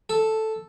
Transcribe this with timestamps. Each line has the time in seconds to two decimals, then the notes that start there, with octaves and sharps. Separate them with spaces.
0.09 A4